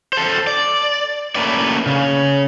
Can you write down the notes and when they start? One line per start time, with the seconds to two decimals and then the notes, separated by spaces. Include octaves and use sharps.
0.13 A4 C5
0.47 D5
1.35 A3 A#3 C#4 B4 D5
1.87 C#3